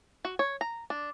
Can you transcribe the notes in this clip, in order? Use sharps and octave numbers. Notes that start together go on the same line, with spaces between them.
F#4
C#5
A#5
D4